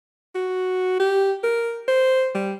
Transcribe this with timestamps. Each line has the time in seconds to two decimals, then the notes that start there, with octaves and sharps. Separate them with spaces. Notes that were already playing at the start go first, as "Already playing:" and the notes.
0.35 F#4
1.00 G4
1.43 A#4
1.88 C5
2.35 G3